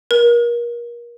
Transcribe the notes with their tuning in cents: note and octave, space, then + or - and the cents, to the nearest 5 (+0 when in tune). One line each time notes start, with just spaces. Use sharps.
A#4 +30